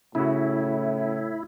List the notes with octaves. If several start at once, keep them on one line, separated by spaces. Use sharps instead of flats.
A2 C#3 E4 F#4